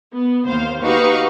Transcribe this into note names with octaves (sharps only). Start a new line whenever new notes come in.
B3
D#2 C5 F5
D#4 F#4 G4 B4 F5 C#6